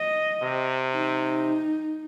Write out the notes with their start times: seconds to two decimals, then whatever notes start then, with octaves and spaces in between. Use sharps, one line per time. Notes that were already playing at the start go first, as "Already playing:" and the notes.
Already playing: D#5
0.42 C3
0.95 D#4